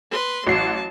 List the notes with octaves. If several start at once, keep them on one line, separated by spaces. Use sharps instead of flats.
B4 C6
A1 F#3 F#4 A5 C7